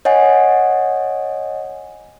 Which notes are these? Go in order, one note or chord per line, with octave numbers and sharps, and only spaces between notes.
C#5 D#5 F#5 G#5